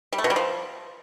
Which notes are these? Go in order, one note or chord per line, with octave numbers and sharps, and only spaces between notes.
G3
A3
B2
G3
F3